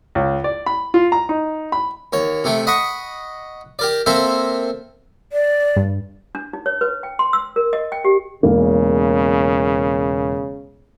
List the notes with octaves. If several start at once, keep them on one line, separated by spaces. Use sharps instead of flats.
C#2
D5
B5
F4
A#5
D#4
B5
D#2 C#5
C3 A3 G5
D#5 F#5 B5 C#6 D#6
G4 A#4 D5
A#3 C4 A4 C5 E5
D5
G2
D4
D#4
C#5
B4
G5
C6
E6
A#4
D#5
G5
G4
E1 C#3 A#3